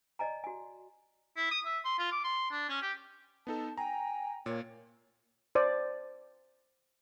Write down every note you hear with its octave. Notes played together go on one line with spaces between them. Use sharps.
D5 D#5 G#5 A#5
F#4 G#5
E4
D#6
E5
C6
F4
D6
C6
D4
C#4
G4
B3 D#4 A4 A5
G5 G#5 A#5
A#2 A#3 C#5
C5 D5